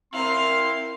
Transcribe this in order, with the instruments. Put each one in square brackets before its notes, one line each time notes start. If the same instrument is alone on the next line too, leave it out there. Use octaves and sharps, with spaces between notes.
[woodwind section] C4 [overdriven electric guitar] E4 A#5 [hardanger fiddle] A#4 F5 [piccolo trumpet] C6